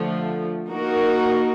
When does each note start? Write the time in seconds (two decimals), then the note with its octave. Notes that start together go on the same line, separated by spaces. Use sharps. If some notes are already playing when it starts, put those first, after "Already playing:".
Already playing: D3 F3 A3
0.69 A#3 D#4 F#4 A#4